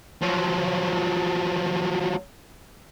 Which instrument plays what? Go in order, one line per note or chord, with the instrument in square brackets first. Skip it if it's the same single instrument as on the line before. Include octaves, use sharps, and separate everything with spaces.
[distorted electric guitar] F3 F#3